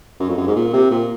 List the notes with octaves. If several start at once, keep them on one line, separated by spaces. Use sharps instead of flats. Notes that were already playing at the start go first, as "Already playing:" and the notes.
F#2
F2
F#2
G#2
A#2
C3
A#2